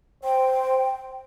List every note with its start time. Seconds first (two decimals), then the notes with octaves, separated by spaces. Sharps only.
0.24 C5 G5